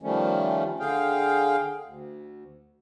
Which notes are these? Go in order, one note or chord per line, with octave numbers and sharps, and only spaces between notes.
D#3 F3 G3 A3 C#4
D3 G#4 F5 G5
D2